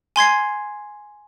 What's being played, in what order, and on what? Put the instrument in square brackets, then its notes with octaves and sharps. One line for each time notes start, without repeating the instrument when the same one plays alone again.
[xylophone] G#5 C6 G#6 C7